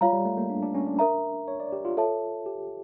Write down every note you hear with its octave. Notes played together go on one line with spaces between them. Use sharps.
G3 F4 C#5 F5 A#5
G3
A3
A#3
D4
D4
C#4
D4
A#4 E5 A#5
C#5
D5
G4
F4
A4 C#5 E5 A5
G4